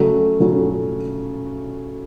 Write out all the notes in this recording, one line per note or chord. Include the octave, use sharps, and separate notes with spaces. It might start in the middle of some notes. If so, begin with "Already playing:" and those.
Already playing: C#3 F#3 A3
C#3 F#3 A3